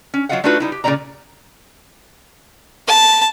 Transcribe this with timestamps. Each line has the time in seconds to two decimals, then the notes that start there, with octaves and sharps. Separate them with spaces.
0.14 C#4
0.29 F#3 C4 F4 D#5 F5 F#5
0.44 A3 D4 D#4 F4 F#4 B4
0.60 G3 D#4 E4
0.72 G4
0.84 A#2 C#3 C4 E4 D5 A#5
2.87 A5